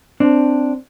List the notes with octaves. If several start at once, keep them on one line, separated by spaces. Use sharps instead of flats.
C4 D4